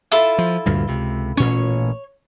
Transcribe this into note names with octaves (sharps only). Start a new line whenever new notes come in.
E4 F4 A4
F3
D2 G2 A#2
C#2 C3
A1 A#2 C#4 C#5